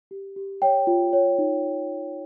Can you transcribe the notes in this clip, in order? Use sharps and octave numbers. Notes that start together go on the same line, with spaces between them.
G4
G4
C#5 G5
F4
C#5
D#4